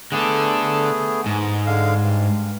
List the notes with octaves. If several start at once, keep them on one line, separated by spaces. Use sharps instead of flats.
D3 A3 B3 D4 G#4
G#2
D3 G#3 F5
G2